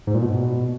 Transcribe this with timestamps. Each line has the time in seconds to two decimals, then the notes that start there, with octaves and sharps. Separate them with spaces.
0.07 G#2
0.15 A#2
0.22 B2